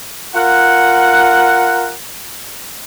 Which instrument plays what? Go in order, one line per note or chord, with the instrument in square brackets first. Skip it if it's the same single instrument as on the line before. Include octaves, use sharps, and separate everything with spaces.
[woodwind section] F4 A#4 F#5